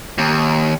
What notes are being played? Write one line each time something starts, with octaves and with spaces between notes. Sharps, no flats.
D#2